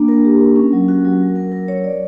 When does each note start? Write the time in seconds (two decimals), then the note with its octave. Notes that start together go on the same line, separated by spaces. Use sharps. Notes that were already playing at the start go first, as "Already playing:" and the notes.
Already playing: A#3 D4
0.08 A#4
0.25 G4
0.40 A#4
0.56 C#4
0.73 F#3
0.88 F#4
1.05 F#3
1.20 A#4
1.36 A#4
1.52 A#4
1.68 C#5
1.84 D5